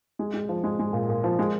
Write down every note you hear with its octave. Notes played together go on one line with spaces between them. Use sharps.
G#3
G#3
F3
G#3
G#3
A#2
A#2
F3
G#3